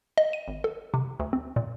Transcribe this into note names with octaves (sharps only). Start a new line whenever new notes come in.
D#5
D#7
G#1
A4
C3
D2
C4
A#2